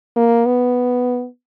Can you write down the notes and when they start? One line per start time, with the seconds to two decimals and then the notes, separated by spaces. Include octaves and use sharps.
0.16 A#3
0.46 B3